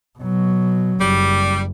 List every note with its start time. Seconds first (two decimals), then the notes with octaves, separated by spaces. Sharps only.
0.19 B2 F#3
1.00 F#1 G3